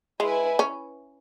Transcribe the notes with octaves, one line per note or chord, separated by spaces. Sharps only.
G#3 E4 B4 G#5
C#4